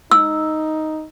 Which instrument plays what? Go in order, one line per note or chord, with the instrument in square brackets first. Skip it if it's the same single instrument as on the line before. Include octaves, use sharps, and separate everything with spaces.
[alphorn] D#4 [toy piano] E6